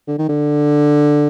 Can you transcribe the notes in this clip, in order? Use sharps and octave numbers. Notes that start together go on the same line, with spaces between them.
D3
D#3
D3